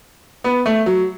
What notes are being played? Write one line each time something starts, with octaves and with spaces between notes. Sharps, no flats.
B3
A3
F#3